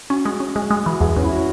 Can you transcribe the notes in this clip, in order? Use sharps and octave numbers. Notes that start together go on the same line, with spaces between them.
C#4 F#4
G#3
C#4
G#3 G#4
G#3
E3 F#4
E2 G#4
E2 C#4
E4
F#4